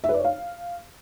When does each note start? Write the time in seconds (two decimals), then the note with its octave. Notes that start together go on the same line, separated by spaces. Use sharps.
0.04 E5
0.09 B4
0.14 D5
0.19 C#5
0.25 F5